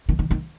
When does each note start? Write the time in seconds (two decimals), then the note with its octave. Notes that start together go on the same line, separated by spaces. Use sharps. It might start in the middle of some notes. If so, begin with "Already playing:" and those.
0.09 D#3
0.19 D#3
0.31 D#3